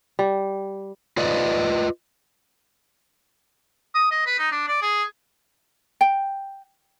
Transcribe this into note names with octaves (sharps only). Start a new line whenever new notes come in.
G3
F4 B4 D5 D#5
D#6
D#5
B4
D#4
D4
D5
G#4
G5